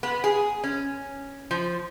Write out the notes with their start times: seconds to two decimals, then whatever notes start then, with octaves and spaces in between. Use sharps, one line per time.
0.03 B3
0.24 G#4
0.64 C#4
1.51 F3